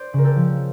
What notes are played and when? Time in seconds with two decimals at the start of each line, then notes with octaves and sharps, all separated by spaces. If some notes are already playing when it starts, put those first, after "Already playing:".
Already playing: C5 D5
0.13 C#3
0.18 A#4
0.24 G4 A4
0.36 F3